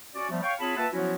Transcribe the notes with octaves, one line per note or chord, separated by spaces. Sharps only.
C#4 F#4 D5
F3 G3 A3 B3
C#5 F5 G5 C#6
C4 F4 G#4 C#5 A5 B5
A#3 F4 B4 E5 F#5 A5
F3 F#3 B3 C#4 E4 F#4